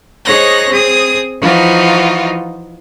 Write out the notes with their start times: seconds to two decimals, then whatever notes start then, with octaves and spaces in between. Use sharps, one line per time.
0.24 D#4 G#4 C5 C#5 F#6 A#6
0.69 C4 G#4 D#6
1.40 E3 F3 D#4 F4 F#4